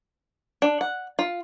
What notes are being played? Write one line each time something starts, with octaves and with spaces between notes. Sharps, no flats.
D4
F#5
F4